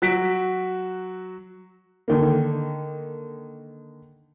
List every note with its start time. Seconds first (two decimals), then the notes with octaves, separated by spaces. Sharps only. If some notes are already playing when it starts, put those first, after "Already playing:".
0.02 F#3 F#4 B6 D7
2.08 D3 D#3 A#3